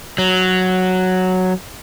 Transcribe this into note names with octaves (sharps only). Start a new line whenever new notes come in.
F#3